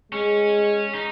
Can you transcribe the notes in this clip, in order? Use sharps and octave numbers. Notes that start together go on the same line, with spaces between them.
G#3 C#4
D#4